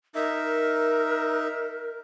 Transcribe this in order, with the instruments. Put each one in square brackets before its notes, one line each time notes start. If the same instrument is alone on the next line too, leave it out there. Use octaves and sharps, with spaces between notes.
[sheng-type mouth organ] D#4 E5 [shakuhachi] A#4